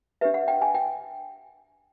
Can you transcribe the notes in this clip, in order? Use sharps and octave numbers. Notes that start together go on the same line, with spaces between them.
D4 G4 B4 E5
F#5
G5
G#5
G5